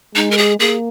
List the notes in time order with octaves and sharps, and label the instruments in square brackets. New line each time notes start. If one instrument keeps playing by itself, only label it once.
[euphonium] G#3 [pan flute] D#4
[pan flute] A#4
G#4
[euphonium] A#3 [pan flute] G#4